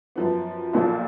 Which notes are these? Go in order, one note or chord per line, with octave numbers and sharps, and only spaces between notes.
F#2 F3 B3
B1 A#2 F3